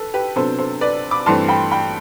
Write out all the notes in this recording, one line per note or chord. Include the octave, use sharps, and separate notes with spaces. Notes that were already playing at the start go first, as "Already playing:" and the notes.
Already playing: A4 B4
G4 B4
C3 F#3 B3 D4 A4 C5
A4 C5
B4 D5
B5 D6
G2 E3 A3 C4 A5 C6
G5 B5
G5 B5